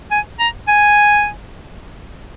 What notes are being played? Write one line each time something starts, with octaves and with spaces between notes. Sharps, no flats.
G#5
A#5
G#5